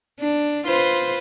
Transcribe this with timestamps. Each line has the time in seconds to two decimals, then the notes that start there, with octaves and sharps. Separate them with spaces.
0.20 D4
0.67 F4 B4 C5